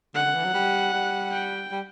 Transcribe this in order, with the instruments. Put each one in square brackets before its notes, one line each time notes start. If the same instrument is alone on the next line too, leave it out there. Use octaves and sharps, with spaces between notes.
[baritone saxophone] D3 [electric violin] F#5
[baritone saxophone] D3
E3
F#3
G3
G3
[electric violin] G5
[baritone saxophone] G3